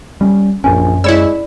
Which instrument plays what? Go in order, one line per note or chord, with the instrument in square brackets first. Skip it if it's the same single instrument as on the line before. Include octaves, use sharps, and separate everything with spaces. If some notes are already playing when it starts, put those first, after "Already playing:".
[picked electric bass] G3 C#4
[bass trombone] A#1 [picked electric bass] F#2 C#4 [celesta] G#5
[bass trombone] G#3 [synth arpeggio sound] E4 C#5 E6 [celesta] D5 B5